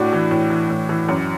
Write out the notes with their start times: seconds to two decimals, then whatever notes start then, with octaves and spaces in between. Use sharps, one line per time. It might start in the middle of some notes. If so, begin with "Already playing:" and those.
Already playing: A2 D4 F#4
0.13 E3
0.31 A2
0.50 E3
0.70 A2
0.89 E3
1.09 F#2